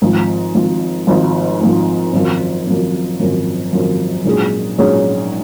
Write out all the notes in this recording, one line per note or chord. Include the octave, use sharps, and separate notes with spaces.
G#1 G#2 F3
G#1 G#2 F3
G#1 G#2 F3
G#1 G#2 F3
G#1 F#2 F3
G#1 F#2 F3
G#1 F#2 F3
G#1 F#2 F3
A#1 G#2 F#3 C#4 G#4
A#1 G#2 F#3 C#4 G#4